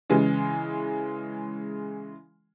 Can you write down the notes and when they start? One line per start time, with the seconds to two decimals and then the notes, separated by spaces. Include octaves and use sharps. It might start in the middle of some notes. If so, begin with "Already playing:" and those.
0.10 C#3 E3 G#3